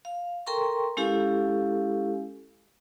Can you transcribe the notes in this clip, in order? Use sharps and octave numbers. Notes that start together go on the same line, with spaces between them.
F5
A4 A#4 G5 A#5 C6 C#6
G#3 C#4 E4 G4 A4 F5